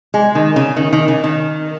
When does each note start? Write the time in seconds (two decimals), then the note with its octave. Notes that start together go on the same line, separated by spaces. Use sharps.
0.14 G#3
0.35 D#3
0.56 C#3
0.76 D#3
0.93 D#3
1.08 C#3
1.24 D#3